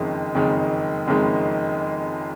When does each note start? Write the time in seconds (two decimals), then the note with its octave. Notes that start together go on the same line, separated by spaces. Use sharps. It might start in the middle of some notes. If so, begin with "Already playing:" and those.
Already playing: F#1 F2 D#3 G#3
0.34 F#1 F2 D#3 G#3
1.07 F#1 F2 D#3 G#3